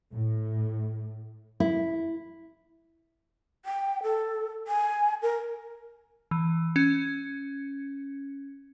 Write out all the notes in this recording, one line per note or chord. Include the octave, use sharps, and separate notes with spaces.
A2
E4
G5
A4
G#5
A#4
E3
C#4